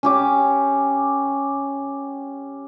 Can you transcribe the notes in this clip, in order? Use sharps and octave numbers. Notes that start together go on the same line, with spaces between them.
C#4 G4 D6